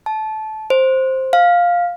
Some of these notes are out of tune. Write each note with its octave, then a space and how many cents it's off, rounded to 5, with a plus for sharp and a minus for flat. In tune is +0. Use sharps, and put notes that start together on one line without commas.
A5 -20
C5 +5
F5 +5